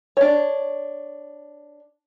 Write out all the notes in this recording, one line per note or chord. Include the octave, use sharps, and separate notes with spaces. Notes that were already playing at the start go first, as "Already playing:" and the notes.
D4 C#5